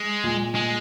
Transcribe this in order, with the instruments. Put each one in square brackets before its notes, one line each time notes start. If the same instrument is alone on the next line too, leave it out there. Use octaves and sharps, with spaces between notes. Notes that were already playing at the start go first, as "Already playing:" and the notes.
Already playing: [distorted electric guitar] G#3
[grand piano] A#2
[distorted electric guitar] G#3